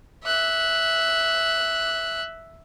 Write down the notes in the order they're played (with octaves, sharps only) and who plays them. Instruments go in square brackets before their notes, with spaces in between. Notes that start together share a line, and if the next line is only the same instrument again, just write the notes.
[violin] E5 F#6